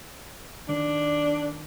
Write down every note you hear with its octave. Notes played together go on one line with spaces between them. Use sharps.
D#3 D4